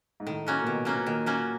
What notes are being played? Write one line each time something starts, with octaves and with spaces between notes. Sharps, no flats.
G#2
A2 D#3
F#3 A#3 C#4 F#4
A#2
B2 D#3
F#3 A#3 C#4 F#4
B2
A#2 D#3
F#3 A#3 C#4 F#4